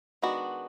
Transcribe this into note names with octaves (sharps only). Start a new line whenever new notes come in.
D#3 G#3 B3 D4 F#4